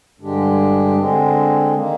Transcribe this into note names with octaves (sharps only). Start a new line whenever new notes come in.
G2 D3 G#3 D4 G4
D3 G#3 C4
D#3 A#3